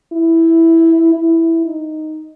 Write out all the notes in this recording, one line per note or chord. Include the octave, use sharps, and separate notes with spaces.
E4
E4
D#4